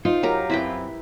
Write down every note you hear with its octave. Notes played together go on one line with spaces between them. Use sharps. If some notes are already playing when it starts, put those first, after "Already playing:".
D#4 F4 C5
F#3 G4 A#4
F#2 C4 E4 B4 G5